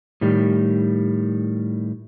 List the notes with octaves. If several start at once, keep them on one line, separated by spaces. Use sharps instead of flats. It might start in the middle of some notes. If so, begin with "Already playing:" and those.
A2 D#3 G3